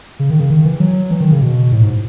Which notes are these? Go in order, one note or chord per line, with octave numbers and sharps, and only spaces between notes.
C#3
D#3
C#3
D#3
E3
F#3
E3
D#3
C#3
B2
A2
G#2